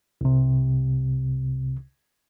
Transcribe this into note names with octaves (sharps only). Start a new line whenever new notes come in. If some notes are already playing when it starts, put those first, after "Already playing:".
C2 C3